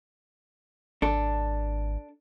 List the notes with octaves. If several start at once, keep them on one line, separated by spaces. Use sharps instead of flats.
G#1 D4 A4